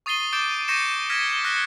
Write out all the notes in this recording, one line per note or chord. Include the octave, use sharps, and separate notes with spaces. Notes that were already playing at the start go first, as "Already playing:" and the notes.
C#6 D#6 A6 C7 D#7 G7
D6 G6 A6 D7
C#6 G6 A#6 C#7 D7 E7
F6 G#6 A#6 B6
F6 F#6 A#6 C#7